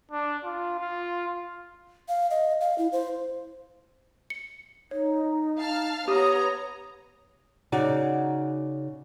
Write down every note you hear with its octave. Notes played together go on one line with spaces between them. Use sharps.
D4
F4
F4
F5
D#5
F5
E4
C5
C#7
D#4 C#5
F5 A5 F6
B3 G4 C#5 A#5 D#6
C#3 D#4 F#4 D5